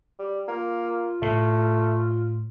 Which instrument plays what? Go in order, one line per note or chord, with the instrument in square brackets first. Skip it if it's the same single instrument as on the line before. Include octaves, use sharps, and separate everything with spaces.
[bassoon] G3
[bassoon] A#3 [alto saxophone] F4
[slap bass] A2 [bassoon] A3